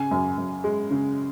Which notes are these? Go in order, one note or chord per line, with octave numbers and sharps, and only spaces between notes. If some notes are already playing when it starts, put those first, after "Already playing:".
Already playing: C#3 G#5
F#2
F#2
G#3
C#3